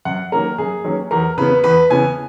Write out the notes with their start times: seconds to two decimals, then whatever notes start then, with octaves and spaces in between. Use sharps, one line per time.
0.05 F#2 F#5
0.32 D#3 F#3 A#3 C#4 A#4
0.58 F#2 G#4
0.84 D#3 F#3 A#3 C#4
1.11 E2 A#4
1.38 C#3 E3 B3 B4
1.64 E2 B4
1.90 C#3 E3 B3 G#5